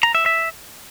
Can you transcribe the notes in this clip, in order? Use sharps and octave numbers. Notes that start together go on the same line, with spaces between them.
A#5
E5
E5